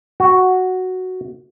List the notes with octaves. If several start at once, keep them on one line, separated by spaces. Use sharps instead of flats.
F#4